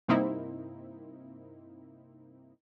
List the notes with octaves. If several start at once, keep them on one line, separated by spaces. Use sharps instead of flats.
G2 C3 A#3 C4 D#4 E4